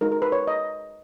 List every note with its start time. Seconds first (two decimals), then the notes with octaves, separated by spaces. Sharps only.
0.01 G#3 D#4 F#4 A#4
0.12 A#4
0.22 B4
0.32 C#5
0.47 D#5